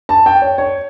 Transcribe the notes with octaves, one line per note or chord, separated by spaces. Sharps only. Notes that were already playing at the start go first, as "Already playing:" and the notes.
A5
G5
C#5
C#5